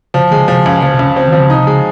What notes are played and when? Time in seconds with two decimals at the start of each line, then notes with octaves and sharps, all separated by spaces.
0.14 C#3 F3
0.31 D#3 G#3
0.37 C#3
0.48 C3 F3
0.59 C#3
0.66 C#2
0.82 C#3 F3
0.94 C3
0.99 C#2
1.05 C#3
1.16 C4
1.28 D#3 F3
1.40 C#3
1.50 C3 D#4
1.66 C#3 G#3